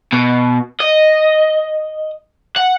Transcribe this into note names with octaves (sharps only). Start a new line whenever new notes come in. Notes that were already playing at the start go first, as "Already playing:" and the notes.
B2
D#5
F#5